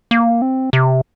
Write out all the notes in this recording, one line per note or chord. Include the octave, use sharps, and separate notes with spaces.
A#3
C4
C3